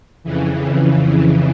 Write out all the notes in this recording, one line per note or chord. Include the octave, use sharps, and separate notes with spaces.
F2 C#3 E3